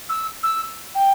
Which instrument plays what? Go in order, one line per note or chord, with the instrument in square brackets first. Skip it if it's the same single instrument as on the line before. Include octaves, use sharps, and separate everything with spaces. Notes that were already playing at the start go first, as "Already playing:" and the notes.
[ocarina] E6
E6
G5